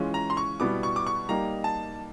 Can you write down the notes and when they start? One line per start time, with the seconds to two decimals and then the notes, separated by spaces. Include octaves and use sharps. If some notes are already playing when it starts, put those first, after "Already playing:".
Already playing: E3 G#3 C#4 F4
0.14 A#5
0.30 C6
0.37 C#6
0.60 B2 G3 B3 E4 D6
0.83 C#6
0.96 D6
1.07 C#6
1.29 G3 A#3 D#4 G4 A#5
1.64 A5